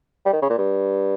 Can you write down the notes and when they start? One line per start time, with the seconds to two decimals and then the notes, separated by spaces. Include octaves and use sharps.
0.25 G3
0.33 D#3
0.42 C#3
0.50 A#2
0.58 G2